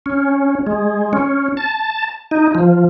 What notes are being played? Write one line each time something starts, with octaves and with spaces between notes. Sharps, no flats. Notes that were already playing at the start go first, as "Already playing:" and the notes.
C#4
G#3
C#4
A5
D#4
F3